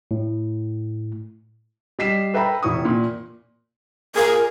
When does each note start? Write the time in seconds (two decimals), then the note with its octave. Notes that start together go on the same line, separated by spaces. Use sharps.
0.11 A2
1.99 G3 D#5 B6 C7 E7
2.34 A4 B4 E5 G5 A#5 B5
2.63 F1 E3 E4 C#6 D#6
2.85 A#2
4.16 A#2 F4 G#4 A#4